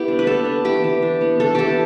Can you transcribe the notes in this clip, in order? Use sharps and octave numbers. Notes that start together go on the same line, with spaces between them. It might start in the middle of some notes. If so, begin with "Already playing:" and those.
Already playing: B3 E4 G4
D4
B4
B3 A4
D4
E3 G4
E3
D4
B3
D4 A4
E3 G4 A4